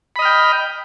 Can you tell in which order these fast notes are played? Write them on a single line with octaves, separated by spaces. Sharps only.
B5 D#5 F6 G5